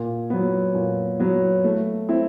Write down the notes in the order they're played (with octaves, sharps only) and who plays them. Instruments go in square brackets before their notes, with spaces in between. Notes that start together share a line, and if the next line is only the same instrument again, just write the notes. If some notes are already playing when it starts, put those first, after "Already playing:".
Already playing: [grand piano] A#2
F#3 B3
A#2
F#3 B3
A3
C4 E4